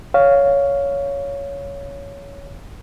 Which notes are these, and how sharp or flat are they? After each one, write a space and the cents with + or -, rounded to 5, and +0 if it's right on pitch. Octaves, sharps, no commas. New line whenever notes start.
C#5 +10 F5 +0